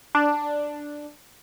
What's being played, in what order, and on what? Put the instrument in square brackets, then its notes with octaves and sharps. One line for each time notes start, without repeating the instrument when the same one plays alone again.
[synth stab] D4